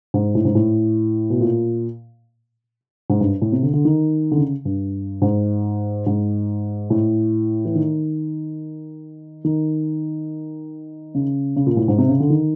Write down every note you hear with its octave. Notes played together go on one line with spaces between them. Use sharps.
G#2
A2
G#2
A2
B2
A#2
G#2
G2
A2
C3
D3
D3
D#3
D3
C#3
G2
G#2
G#2
A2
E3
D#3
D#3
C#3
C#3
A#2
A2
G#2
C3
C#3
D3
D#3